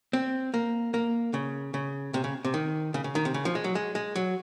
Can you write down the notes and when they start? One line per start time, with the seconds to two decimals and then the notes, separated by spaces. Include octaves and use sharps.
0.13 C4
0.54 A#3
0.94 A#3
1.34 C#3
1.74 C#3
2.14 C3
2.24 C#3
2.45 C3
2.54 D#3
2.94 C#3
3.04 C#3
3.15 D#3
3.25 C3
3.34 C#3
3.45 F3
3.55 G#3
3.64 F#3
3.75 G#3
3.95 G#3
4.16 F#3